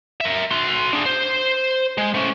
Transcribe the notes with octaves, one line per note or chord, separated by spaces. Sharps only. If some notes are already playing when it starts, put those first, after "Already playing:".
A#4 E5
F#4 C6
D4 G#4
C5
G#3
A3 C#4